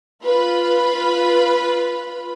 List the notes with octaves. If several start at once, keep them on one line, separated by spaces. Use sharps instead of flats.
F4 B4 B5